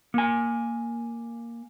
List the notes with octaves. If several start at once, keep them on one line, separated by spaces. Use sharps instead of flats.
A#3 G#5